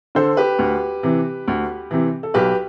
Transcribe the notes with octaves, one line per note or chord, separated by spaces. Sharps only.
D3 A4 C5
G4 B4
D2
C3 E3
D2
C3 E3
A4
B1 G4 B4